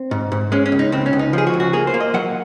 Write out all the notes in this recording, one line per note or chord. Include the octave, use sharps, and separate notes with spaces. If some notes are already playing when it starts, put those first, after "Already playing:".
Already playing: C4
G#2
G#2
G#3 C#4
C#4
C#2
D#4
C#2 C4
C#4
C#2
D#4
F3 G#4
F#4
C#2
F#4
A#3 G#4
C5
A#3
D#5
F#3 F#5